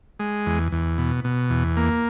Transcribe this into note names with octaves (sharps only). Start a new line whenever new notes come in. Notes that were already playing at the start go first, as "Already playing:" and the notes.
G#3
E2
E2
B2
B2
E2
A#3